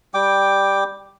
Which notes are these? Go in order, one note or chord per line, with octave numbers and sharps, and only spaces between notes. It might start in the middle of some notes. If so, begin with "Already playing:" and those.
G3 G5 D6